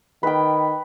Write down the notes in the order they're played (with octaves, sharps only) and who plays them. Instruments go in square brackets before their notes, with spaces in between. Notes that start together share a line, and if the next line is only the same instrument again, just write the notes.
[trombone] D#3 [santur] B4 G5